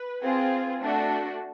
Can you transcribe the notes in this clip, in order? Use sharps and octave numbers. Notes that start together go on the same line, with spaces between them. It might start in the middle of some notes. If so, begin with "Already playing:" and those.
Already playing: B4
C4 F4 G#4
A3 D4 F#4